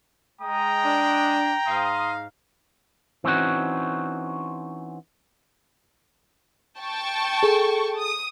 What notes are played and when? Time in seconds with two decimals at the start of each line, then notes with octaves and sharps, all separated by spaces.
0.41 G#3 G5 A#5 D#6
0.84 D4
1.67 G#2 F5 C6 D#6
3.24 E3 C4 C#4 D#4 F#4
6.78 G5 A5 C#6
7.43 G#4 A4
7.98 D#6